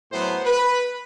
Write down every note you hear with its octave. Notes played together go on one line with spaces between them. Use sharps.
A2 F#3 B3 C5
B4